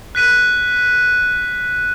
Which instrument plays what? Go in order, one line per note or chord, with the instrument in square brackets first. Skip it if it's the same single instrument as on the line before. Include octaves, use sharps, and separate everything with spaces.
[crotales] F#6 B6 D#7